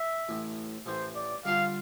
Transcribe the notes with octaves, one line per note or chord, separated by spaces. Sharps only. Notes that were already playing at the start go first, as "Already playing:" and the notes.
Already playing: E5
A1 A2 E3
A1 A2 E3 C5
D5
D3 G3 D4 F4 C5 F5